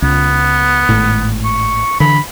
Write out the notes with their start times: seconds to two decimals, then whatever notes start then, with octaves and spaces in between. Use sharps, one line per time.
0.02 C#2 B3
0.89 G#1 A2
1.44 C#6
2.00 D3 E3 B5